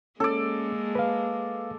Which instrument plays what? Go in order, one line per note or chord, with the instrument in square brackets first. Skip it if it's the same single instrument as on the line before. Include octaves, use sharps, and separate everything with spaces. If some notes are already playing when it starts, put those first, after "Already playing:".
[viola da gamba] G#3 A#3 [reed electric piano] C#4 [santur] A4 D5
[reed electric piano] B4 F5